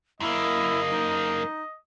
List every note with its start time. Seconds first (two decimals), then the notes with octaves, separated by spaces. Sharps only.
0.20 F#2 A#3 E4 D#5
0.90 D#4